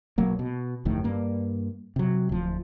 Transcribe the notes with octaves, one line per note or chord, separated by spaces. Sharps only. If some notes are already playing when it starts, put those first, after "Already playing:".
B1 F#3 A#3
B2
G1 F2 A2 D#3
G2 A#3
C3 F#3
D1 F3